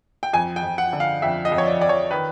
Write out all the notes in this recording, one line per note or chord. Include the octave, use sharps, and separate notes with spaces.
G5
F2 G#5
G5
F2
F#5
D3
F5
F2 E5
D#5
F2
C#5
D5
F2 D5
C#5
D#3 B4